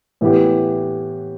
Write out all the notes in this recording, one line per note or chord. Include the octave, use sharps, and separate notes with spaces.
A2 E3 B3 E4 G4